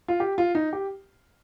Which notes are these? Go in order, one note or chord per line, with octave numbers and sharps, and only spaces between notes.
F4
G4
F4
D#4
G4